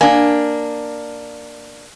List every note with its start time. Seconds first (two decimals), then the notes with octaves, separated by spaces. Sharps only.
0.01 A#3 D4 G#5